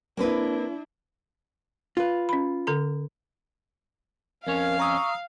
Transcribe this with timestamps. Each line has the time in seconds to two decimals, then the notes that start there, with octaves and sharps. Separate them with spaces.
0.17 A#3 C4 D4 E4 B4
1.97 F4 B4
2.29 C#4 B5
2.67 D3 A4 A#5
4.47 F2 C#4 A#4 C#5 F5
4.80 A#5 C#6 D#6 E6